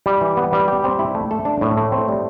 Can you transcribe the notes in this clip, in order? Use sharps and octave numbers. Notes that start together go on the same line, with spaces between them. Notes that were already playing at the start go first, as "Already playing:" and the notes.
G3
E3
B3
G3
G4
C4
E4
A3
A4
D4
A2
A3
C4
G3